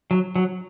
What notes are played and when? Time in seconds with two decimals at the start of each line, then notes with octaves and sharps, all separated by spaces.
0.11 F#3
0.36 F#3